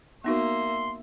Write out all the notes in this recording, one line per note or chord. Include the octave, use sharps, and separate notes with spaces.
A#3 B3 D#4 F#4 E5 C6